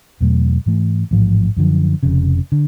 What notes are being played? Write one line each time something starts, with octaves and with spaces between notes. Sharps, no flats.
E2 B2 F#3 A3
G#2 E3 A3
A1 G#2 F3
F#2 D3 F3
F1 F2 C#3
D3